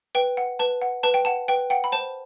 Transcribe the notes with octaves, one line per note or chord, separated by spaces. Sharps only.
B4 G5
F#5
B4 A5
F#5
B4 A5
G5
F#5 A5
B4 G5
F#5 G5
B5
C5 A5